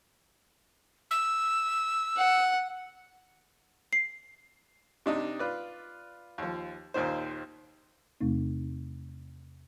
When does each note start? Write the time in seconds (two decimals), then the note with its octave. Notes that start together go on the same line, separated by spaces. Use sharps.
1.11 E6
2.17 F#5
3.93 C7
5.06 C3 D4 D#4
5.39 F4 B4 D5
6.38 D#2 F3
6.94 D#2 A#2 D#3 C5
8.21 E2 C3 A3 C4 D#4